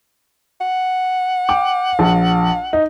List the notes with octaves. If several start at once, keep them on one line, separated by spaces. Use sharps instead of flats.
F#5
G5 D6
A#1
D#4